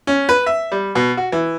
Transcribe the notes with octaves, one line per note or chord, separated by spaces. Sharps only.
C#4
B4
E5
G3
B2
F#4
E3